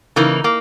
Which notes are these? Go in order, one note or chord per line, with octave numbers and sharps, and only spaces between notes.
C#3 E3 A#3 D#4
A#3